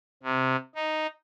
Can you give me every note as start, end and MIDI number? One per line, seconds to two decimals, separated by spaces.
0.23 0.56 48
0.75 1.07 63